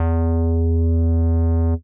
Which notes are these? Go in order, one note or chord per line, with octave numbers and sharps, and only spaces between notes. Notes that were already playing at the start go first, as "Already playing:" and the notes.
Already playing: E2